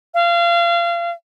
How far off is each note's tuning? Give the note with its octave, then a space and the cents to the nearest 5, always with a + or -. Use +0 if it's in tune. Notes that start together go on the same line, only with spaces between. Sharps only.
F5 -30